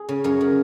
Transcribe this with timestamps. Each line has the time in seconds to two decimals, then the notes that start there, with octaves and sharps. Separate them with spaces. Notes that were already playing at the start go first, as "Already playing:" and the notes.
Already playing: G#4
0.09 C#3
0.24 F#2 A#4 C#5
0.41 C#3